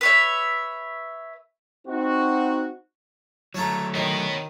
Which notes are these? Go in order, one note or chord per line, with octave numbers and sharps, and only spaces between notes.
B4 C#5 E5
C4 D#4 F#4
F#3 A3 C#4 A5 A#5
B2 D#3 B3 C#5